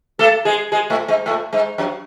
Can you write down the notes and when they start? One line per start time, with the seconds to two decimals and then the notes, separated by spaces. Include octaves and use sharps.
0.19 A3 A4
0.45 G#3 G#4
0.72 G#3 G#4
0.90 A2 A3
1.08 G#2 G#3
1.26 A2 A3
1.53 G#2 G#3
1.78 F#2 F#3